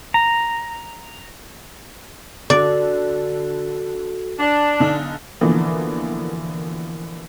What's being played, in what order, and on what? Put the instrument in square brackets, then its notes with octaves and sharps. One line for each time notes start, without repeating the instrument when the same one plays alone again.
[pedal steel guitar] A#5
[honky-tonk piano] D3 [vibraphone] F#4 A4 [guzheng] D5
[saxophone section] D4
[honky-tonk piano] B1 D3 D#4
B2 D3 E3 F3 A#3